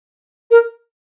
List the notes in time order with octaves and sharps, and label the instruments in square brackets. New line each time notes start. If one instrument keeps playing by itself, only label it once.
[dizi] A#4